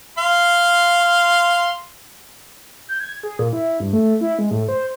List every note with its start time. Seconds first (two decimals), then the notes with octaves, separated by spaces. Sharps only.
0.18 F5 C6
2.89 G6
3.00 G#6
3.23 G#4
3.39 A#2
3.53 E4
3.80 G2
3.93 A3
4.21 E4
4.39 G#3
4.51 A2
4.68 C5